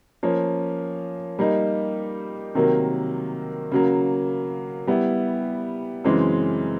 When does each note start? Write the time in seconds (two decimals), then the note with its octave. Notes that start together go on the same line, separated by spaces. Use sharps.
0.23 F3 A#3 C#4
1.39 G3 A#3 D#4
2.55 C3 D#3 F#3 A#3
3.72 C#3 F#3 A#3
4.87 G3 B3 E4
6.04 F#2 C#3 E3 G#3 C4